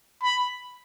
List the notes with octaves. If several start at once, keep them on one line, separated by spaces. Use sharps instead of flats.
B5